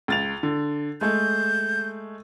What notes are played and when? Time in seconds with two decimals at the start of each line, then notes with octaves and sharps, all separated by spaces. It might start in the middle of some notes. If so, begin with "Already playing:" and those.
0.08 C#2 A6 F7
0.43 D3
1.01 G#3 A3 G6